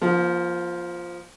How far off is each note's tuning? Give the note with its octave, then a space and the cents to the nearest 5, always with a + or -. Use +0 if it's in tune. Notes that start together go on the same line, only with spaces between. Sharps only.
F3 +0 A#3 +45